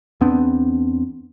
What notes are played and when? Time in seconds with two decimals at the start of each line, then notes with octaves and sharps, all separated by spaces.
0.21 E2 B3 C4 D4